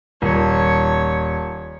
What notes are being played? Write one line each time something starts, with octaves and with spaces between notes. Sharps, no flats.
D#1 C#5 A5